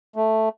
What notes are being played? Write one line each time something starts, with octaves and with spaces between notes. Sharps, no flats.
A3